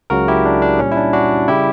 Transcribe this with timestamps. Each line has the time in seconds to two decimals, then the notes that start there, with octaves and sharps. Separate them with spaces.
0.10 C#2 C#3 F#3 F#4 A#4
0.28 E4 G4
0.46 D4
0.62 D4
0.79 A#2 G3 C#4
0.92 E4
0.97 D4
1.13 D4 F#4
1.48 C#3 G3 E4 G4